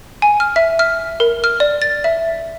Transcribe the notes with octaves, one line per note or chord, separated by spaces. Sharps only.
G#5
F6
E5
F6
A#4
F6
D5
A6
E5